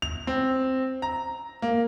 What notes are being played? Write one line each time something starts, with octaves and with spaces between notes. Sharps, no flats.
F7
C4
A#5
A#3